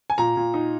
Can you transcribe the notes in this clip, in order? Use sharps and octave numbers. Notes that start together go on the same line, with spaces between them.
G#5
A#2 A#5
A#2
D#4